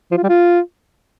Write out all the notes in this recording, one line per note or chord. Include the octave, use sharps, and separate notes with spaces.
F3
F4
G3
F4